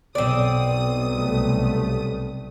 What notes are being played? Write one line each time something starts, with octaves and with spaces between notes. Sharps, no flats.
B1 C4 D5 D#6
C2 A3